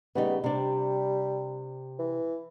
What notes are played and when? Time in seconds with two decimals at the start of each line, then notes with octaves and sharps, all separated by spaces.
0.15 C#3 G3 B3 D#4
0.44 C3 G3 D4
1.99 E3